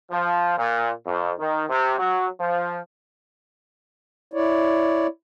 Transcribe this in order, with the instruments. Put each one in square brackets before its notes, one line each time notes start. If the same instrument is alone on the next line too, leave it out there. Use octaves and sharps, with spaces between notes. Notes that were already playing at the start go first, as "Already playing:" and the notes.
[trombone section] F3
A#2
F2
D#3
C3
F#3
F3
[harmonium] E4 C#5 D5